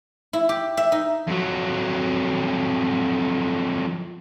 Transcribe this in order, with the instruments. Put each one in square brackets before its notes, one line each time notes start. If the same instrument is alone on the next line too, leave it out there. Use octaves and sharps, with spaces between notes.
[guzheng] E4
G4
E5
D#4
[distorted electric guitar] F2 F#3